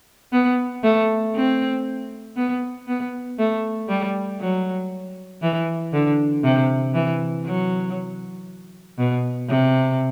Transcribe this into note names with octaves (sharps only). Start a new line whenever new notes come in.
B3
A3
C4
B3
B3
A3
G3
F#3
E3
D3
C3
E3
F#3
B2
C3